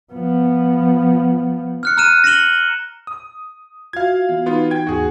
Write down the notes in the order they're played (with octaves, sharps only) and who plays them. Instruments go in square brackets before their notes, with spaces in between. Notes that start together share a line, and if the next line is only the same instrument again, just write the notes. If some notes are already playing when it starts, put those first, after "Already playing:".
[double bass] F3 B3
[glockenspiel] F6 F#6 C#7
A#5 F6 F#6 D#7 E7
A#6 C#7 E7 F#7 G7
[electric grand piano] D#6
[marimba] F4 F#4 E5 [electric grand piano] F5 G#6
[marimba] E3 B3
[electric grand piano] B3 F4 [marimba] D#4
[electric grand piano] G5 G#6
[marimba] D#2 G#2 [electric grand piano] F#4 G#4